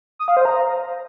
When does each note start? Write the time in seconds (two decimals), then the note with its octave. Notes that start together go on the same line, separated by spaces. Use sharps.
0.19 D#6
0.28 F5
0.37 C5
0.45 A#5